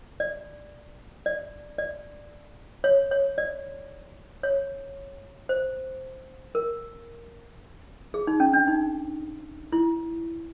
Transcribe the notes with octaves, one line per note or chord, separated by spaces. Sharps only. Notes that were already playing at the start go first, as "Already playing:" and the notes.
D5
D5
D5
C#5
C#5
D5
C#5
C5
A#4
G#4
D#4
C#4
D4
D#4
E4